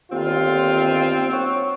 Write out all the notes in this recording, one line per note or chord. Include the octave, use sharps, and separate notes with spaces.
G1 D#2 C4 F4
C#5 F#5